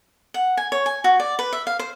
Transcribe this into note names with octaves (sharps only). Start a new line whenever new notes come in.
F#5
G#5
C#5
G#5
F#4
D5
B4
E5
F5
C5